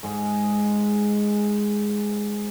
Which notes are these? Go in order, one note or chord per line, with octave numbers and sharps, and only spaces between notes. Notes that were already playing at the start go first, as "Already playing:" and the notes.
G#2 G#3